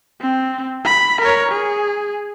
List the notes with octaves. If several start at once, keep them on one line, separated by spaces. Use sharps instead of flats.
C4
B5
A#4 C#5
G#4